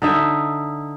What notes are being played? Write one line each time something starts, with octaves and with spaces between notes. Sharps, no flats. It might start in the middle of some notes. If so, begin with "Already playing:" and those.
D3 D#4 E5